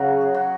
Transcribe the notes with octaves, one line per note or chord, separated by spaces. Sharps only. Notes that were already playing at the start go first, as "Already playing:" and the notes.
Already playing: C#3 F#3 F#4
G#4
F#4